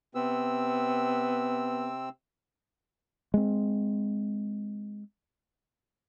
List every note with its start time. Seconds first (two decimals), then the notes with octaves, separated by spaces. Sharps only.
0.15 C3 B3 C4 E6
3.34 G#3 C4